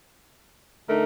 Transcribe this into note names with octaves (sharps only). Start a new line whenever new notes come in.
D3 A3 D#4 A#4